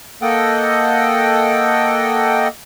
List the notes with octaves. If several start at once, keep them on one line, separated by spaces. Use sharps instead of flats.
A#3 A4 D#5 F#5 G5